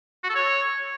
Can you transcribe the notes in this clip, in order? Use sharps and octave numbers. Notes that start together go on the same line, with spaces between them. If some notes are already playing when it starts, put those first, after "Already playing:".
F#4
A4
C#5